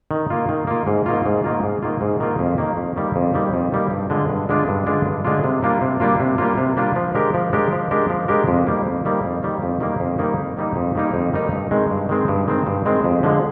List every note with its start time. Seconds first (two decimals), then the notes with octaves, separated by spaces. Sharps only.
0.11 D#3
0.30 A#3 F4
0.49 D#3
0.67 A#3 F4
0.87 G#2
1.06 D#3 A#3 F4
1.26 G#2
1.44 D#3 A#3 F4
1.63 G#2
1.82 D#3 A#3 F4
2.01 G#2
2.20 D#3 A#3 F4
2.39 F2
2.58 D#3 G3 A#3
2.77 F2
2.96 D#3 G3 A#3
3.16 F2
3.34 D#3 G3 A#3
3.53 F2
3.72 D#3 G3 A#3
3.91 G2
4.10 D3 G#3 D4 F4
4.30 G2
4.49 D3 G#3 D4 F4
4.68 G2
4.86 D3 G#3 D4 F4
5.05 G2
5.24 D3 G#3 D4 F4
5.44 C3
5.63 G3 A#3 D4 F4
5.81 C3
6.00 G3 A#3 D4 F4
6.20 C3
6.38 G3 A#3 D4 F4
6.58 C3
6.77 G3 A#3 D4 F4
6.96 F3
7.15 G#3 D4 G4 A#4
7.34 F3
7.53 G#3 D4 G4 A#4
7.72 F3
7.91 G#3 D4 G4 A#4
8.10 F3
8.28 G#3 D4 G4 A#4
8.48 F2
8.67 D#3 G3 A#3
8.86 F2
9.05 D#3 G3 A#3
9.24 F2
9.43 D#3 G3 A#3
9.63 F2
9.80 D#3 G3 A#3
10.00 F2
10.18 D#3 G3 A#3 D#4
10.38 F2
10.57 D#3 G3 A#3 D#4
10.76 F2
10.95 D#3 G3 A#3 D#4
11.14 F2
11.33 D#3 G3 A#3 D#4
11.52 G2
11.71 D#3 G#3 C4
11.90 G2
12.09 D#3 G#3 C4
12.28 G2
12.48 D#3 G#3 C4
12.67 G2
12.85 D#3 G#3 C4
13.04 F2
13.23 D3 F3 G#3